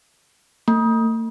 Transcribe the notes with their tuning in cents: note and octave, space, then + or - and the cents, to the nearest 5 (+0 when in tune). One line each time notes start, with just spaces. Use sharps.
A3 +45